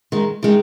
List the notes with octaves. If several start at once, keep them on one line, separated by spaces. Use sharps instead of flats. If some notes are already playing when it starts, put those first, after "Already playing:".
D#3 G#3 D#4
D#3 G#3 D#4